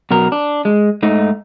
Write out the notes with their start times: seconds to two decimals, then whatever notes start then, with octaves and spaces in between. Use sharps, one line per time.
0.11 B2 F#3 A#4
0.32 D4
0.65 G#3
1.03 G#2 A3 D#4